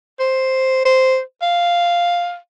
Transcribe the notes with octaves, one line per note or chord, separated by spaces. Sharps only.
C5
C5
F5